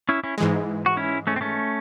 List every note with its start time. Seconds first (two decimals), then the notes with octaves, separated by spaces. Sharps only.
0.09 C#4 E4
0.24 C#4 E4
0.38 G#2 E3 G#3
0.86 F#4
0.97 C#4 E4
1.27 A3 C#4
1.36 C4
1.41 A3 C#4